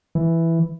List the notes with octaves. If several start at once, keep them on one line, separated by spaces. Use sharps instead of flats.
E3